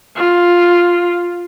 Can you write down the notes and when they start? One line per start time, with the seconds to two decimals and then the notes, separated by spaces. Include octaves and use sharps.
0.16 F4